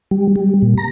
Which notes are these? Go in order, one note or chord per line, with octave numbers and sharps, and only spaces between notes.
G3
G3
A#2
A#5